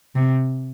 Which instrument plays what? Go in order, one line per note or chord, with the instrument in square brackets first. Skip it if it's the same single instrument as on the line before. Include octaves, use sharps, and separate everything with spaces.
[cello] C3